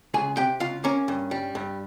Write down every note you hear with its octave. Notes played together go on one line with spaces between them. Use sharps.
C#2 G#4 G#5
C3 G4 G5
C#2 F4 F5
A#3 C#4 C#5
G2
G3
G2